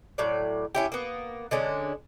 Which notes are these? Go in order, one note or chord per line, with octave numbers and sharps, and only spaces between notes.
A2 F#3 D5
C#4 E4 G4
A#3 B3
D3 G#3 C#4 D4